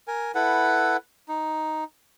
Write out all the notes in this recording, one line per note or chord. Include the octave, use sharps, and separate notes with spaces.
A#4 G#5
E4 A4 B4 F#5
D#4